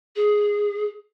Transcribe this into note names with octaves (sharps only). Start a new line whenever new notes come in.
G#4